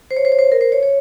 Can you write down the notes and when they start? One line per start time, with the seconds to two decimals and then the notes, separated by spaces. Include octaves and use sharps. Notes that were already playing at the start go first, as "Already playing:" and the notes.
0.11 C5
0.17 C#5
0.25 C5
0.32 C#5
0.39 C5
0.52 A#4
0.61 C5
0.72 C#5
0.83 C#5